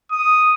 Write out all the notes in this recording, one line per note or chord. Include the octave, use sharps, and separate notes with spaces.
D#6